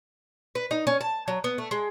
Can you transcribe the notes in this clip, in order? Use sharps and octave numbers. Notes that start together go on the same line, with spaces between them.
B4
D#4
C#4
A5
F#3
B3
A3
G#3